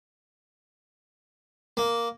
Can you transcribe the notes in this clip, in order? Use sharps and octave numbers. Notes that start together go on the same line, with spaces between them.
A#3